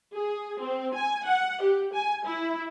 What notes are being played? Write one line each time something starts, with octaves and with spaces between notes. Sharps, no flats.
G#4
C4
G#5
F#5
G4
G#5
E4